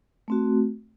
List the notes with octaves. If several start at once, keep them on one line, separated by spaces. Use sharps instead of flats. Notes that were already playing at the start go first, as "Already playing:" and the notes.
A3 C4 F#4